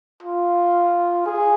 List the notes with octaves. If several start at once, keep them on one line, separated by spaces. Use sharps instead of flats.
F4
G#4